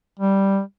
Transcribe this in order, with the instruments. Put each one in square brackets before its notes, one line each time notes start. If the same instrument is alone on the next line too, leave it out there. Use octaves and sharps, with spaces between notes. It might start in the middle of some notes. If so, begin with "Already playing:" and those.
[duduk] G3